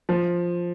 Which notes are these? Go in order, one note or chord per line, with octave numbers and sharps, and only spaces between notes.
F3